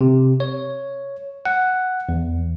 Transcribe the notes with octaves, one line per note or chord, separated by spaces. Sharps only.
C3
C#5
F#5
E2